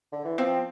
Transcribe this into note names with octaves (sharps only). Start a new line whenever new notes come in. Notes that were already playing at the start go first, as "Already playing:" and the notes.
D3
E3
F3 C4